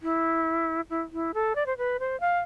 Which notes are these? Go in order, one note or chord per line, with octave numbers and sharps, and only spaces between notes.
E4
E4
E4
A4
D5
C5
B4
C5
F5